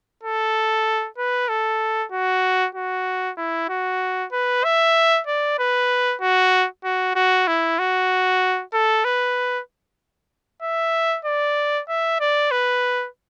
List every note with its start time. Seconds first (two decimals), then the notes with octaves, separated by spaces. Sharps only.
0.23 A4
1.18 B4
1.49 A4
2.12 F#4
2.75 F#4
3.38 E4
3.70 F#4
4.33 B4
4.64 E5
5.27 D5
5.59 B4
6.22 F#4
6.85 F#4
7.16 F#4
7.48 E4
7.79 F#4
8.74 A4
9.05 B4
10.62 E5
11.25 D5
11.89 E5
12.20 D5
12.52 B4